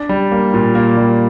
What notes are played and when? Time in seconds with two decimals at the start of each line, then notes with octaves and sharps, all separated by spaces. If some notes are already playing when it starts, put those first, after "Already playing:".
Already playing: D4
0.09 G3
0.32 A#3
0.54 A#2
0.75 A#3
0.97 G3